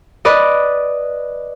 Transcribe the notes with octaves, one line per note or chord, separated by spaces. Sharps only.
B4 D5 D#5